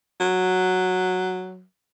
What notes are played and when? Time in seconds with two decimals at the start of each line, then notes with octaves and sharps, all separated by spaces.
0.20 F#3